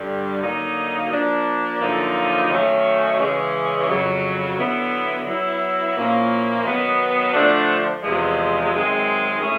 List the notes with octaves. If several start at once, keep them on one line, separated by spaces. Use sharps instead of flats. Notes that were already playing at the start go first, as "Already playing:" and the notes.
Already playing: G2 D3 G3
D3 F#3 A#3 D#4
F3 A#3 D4
F#2 D3 F3 A#3 D#4
D#3 F#3 A3 C#4
C#3 E3 G#3 C#4
F2 C#3 F#3
D3 F#3 B3 E4
F#3 B3 E4
A#2 F3 A#3 C#4 E4
D#3 F#3 B3
D3 F3 A3 D4
E2 C3 F3 G#3
F#2 D#3 G#3 C4
A3 C#4 E4 G#4